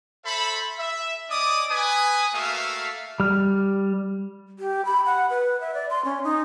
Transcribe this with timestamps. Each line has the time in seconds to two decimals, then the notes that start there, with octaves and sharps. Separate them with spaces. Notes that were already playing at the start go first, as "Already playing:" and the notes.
0.25 A4 C5 E5 B5
0.78 E5
1.30 C#4 D5 D#5 D6 D#6
1.70 B4 G#5 D#6
2.34 A3 A#3 F#4 A4 E5 F5
3.20 G3 F6
4.59 G4
4.85 B5
5.06 F#5
5.30 B4
5.61 E5
5.74 D5
5.90 C6
6.05 C#4
6.24 D#4